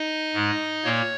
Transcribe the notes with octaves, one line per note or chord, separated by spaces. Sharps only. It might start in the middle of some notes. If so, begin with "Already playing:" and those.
Already playing: D#4 D#5
G#2 G#3
A#2 A#3 C#5